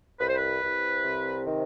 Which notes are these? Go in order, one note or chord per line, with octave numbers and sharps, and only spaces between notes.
C2 B4
C5
B4
C2
C3
D#3